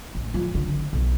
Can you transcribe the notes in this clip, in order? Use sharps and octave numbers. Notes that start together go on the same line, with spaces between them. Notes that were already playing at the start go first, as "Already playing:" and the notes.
A1
F3
D3
B1